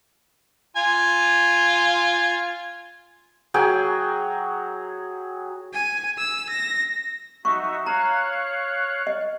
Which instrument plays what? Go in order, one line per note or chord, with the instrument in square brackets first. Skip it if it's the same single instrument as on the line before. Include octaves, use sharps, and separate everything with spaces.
[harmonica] F4 G#5
[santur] F#3 G#4 G5 G#5
[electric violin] G#5
E6
A#6
[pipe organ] D#4 F#4 E5 [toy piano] C#6
[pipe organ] C#5 F5 F#6 [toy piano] A#5
[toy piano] D#5